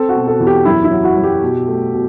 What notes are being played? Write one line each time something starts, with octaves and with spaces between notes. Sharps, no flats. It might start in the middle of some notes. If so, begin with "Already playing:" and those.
Already playing: C4 A4
F#4
B2
A4
E2
G4
F#2 E4
E4
F#3
F#4
F#2
G4
B2
A3
B2